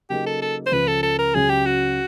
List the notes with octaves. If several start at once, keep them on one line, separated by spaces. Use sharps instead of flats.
C#3 F#3 A#3 D#4 G4 G#4
A4
A4
C5
C#2 C#3 F3 B4
A4
A4
A#4
C#2 C#3 F#3 G#4
G4
F#4